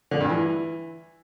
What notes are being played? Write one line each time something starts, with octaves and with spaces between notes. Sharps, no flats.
D3
G2
E3